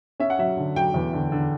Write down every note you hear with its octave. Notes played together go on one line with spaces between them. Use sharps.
C#4 E5
F#5
F#3 E5
D3
F#3 G5
E2
D3
D3